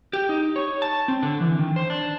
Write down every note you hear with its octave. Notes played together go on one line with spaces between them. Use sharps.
G4
D#4
C#5
A5
C4
D3
E3
D#3
C5
D4